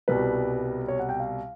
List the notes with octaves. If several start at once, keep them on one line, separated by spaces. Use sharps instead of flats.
C2 B2 G3 B4
C#5
F#5
G5
F5